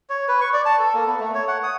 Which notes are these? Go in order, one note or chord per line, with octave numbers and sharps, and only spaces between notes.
C#5
B4
C#6
D5
A5
A4
A#3
B3
A3
C#5
F#5
D#6